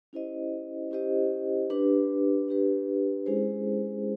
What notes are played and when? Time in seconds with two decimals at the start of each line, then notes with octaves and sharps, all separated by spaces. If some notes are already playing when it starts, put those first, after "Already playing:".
0.13 C#4 E4 G4 C5 D#5
0.91 C#4 E4 G4 C5 D#5
1.70 D4 G4 B4
2.48 D4 G4 B4
3.26 G#3 C#4 E4 G#4 C5